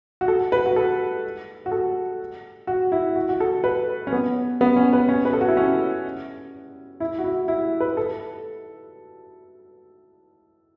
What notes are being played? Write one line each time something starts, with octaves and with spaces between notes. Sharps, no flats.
F#4
A4
B4
F#4
A4
F#4
A4
F#4
E4
F#4
F#4
A4
B4
C#4
B3
B3
C#4
B4
C#4
B4
A4
F#4
E4
C#4
E4
F#4
E4
E4
B4
A4